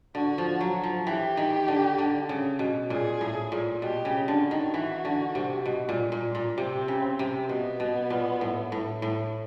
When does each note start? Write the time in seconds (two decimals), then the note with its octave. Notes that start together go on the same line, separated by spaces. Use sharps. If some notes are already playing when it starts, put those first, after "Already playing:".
0.15 D3 F#4
0.38 F3
0.61 F#3
0.83 F3
1.06 E3 G4
1.37 D#3
1.68 D3
1.98 D3
2.29 C#3
2.59 B2
2.90 A#2 G#4
3.21 A2
3.52 A#2
3.82 B2 G4
4.05 C#3
4.28 D3 F#4
4.51 D#3
4.74 E3
5.05 D3
5.35 C3
5.66 B2
5.89 A#2
6.12 A#2
6.35 A#2
6.58 C3 C4
6.88 C#3
7.19 C3
7.49 B2 B3
7.80 B2
8.10 A#2
8.41 A2
8.72 A2
9.02 A2